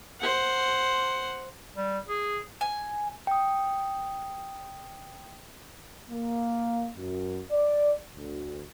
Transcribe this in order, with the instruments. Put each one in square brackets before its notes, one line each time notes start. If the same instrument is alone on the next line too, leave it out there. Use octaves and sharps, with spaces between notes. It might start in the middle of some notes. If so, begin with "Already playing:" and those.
[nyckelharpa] C5 F#5
[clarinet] G3
G#4
[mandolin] G#5
[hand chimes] G5 D#6
[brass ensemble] A#3
F#2
D5
D2